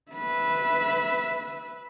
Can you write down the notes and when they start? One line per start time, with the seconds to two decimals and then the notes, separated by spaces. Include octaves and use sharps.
0.12 B4 E5